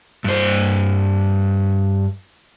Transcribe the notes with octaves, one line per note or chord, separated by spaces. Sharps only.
G2 C5